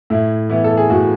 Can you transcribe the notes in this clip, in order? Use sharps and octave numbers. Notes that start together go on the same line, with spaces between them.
A2 E4
E3 B3 E4
A4
G#4
A2 F#4